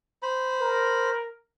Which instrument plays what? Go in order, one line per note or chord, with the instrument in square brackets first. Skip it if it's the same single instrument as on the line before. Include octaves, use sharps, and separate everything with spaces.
[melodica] C5 B5
[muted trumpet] A#4